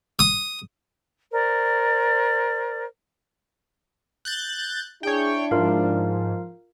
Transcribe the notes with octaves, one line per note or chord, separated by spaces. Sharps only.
D#6
A#4 C5 D5
F#6 G6 A6
D4 E4 G#4 C#5 G5
G#2 F3 F4 A#4 F5